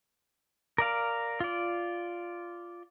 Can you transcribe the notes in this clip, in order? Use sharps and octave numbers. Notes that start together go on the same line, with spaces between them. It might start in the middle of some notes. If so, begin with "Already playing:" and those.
A#4 D5 F5
F4 D5